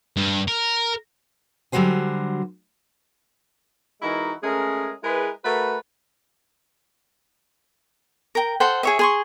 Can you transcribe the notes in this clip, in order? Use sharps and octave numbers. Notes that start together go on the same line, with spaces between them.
G2
A#4
D3 F#3 G3 F#4 C5 G#5
E3 G#3 D#4 E4 F#4 A#4
G#3 A3 C#4 G#4 A#4
G#3 E4 G#4 A#4 B4
A3 F#4 A#4 B4
A#4 G5
A4 C5 F#5 G5
G#4 C#5 E5
G#4 C6 C#6